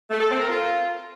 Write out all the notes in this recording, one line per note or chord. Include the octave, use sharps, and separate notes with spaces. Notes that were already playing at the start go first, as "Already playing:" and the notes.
A3
A4
C4
A#4
F4